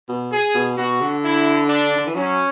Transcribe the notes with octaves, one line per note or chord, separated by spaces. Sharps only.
B2
G#4
B2
B2 F#4
D3
E4
D4
D3
E3
F#3 C#4